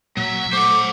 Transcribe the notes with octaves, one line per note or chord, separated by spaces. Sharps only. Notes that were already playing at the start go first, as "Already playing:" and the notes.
A#2 F#3 E5
A3 C5 F#5 C#6 D6